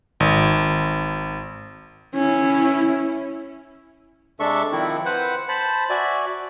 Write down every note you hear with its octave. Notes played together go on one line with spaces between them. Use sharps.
G#1
C#4 E4
C3 G#3 D4 A4 E5 C#6
D#3 F3 C4 E4
B4 C5 F#5
C5 A5 B5
F#4 D5 E5 G#5